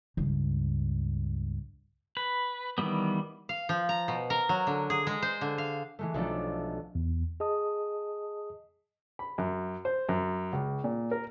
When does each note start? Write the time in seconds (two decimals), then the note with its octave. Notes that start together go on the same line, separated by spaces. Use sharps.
0.17 C#2 G2
2.17 B4
2.78 D#3 E3 G3 B3
3.49 F5
3.69 F3
3.89 A#5
4.08 B2
4.30 A#4
4.49 F#3
4.67 D3
4.90 G#4
5.07 G#3
5.22 C5
5.41 D3
5.58 F5
5.99 E3 G#3 A3
6.14 B1 F3 A3 C4 D4 A4
6.95 E2
7.40 G#4 D#5 A5 D#6
9.19 B5
9.38 F#2
9.85 C5
10.09 F#2
10.53 C#2
10.84 A#2
11.11 A#4